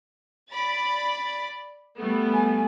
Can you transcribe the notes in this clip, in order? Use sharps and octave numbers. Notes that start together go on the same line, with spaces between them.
D5 B5 A6
G3 A3 B3
G#5